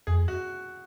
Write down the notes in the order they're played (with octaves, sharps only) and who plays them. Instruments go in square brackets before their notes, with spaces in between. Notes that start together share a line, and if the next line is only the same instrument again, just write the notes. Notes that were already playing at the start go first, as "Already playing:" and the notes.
[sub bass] F2 [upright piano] G#4
[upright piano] F#4